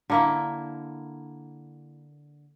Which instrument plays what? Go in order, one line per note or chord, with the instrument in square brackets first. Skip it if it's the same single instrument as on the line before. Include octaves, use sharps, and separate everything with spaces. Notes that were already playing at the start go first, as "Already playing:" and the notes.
[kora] D3 A#3 E4